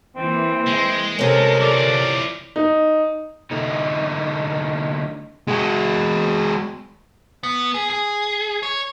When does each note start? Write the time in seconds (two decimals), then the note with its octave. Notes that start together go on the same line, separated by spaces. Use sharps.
0.16 E3 A#3 C4
0.67 G#3
1.19 C3 C#4 A4 A#4
1.61 E3 F4 D5
2.56 D#4
3.51 D3 A3 D#4
5.48 G#3 F#4
7.43 B3
7.74 G#4
7.90 G#4
8.63 C#5